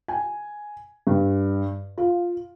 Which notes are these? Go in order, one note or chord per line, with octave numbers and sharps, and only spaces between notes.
G#5
G2
F4